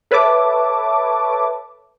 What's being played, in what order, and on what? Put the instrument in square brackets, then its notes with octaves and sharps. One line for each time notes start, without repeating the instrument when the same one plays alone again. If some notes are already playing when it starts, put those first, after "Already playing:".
[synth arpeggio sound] A4 B4 C#5 E5 A5 D6